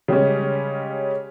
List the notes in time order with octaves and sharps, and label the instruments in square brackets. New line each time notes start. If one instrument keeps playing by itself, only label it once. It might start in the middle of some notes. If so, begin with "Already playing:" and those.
[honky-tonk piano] C#3 G3 G#3 C#4